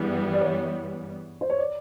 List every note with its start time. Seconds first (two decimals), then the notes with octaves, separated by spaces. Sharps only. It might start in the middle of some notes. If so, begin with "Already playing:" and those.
Already playing: G2 E3 G3 B3 G#4
0.34 D5
0.41 C#5
1.41 C5
1.50 C#5
1.59 D5